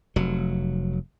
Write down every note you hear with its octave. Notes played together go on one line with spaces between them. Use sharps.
F1 F#3